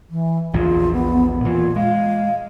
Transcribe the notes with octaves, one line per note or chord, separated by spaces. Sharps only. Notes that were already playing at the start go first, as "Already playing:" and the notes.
E3
A#1 E2 A#2 F4
B3
A#2 E3 F4
G#3 F5